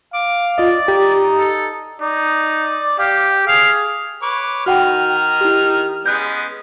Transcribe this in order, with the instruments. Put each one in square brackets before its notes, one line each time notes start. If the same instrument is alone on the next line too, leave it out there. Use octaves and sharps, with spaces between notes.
[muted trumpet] F5 [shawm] D6
[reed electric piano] F4 D#5 [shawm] D5
[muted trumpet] D#4 [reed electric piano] G4
[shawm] A4
[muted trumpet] D#4 [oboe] D5
[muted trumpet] G4 [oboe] F5
[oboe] G#4 [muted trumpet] F5
[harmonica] B4 C#5 D6
[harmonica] D#3 D#4 F6 [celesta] F#4 F#5 G5
[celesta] E4 G4
[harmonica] G#3 B3 C#4 [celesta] F#6 G6